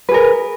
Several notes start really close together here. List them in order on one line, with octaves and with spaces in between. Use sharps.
B4 G#4 A#4